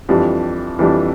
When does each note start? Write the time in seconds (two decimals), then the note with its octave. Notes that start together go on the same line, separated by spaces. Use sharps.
0.09 F2 E3 G3 D4 G4
0.79 F2 E3 G3 D4 G4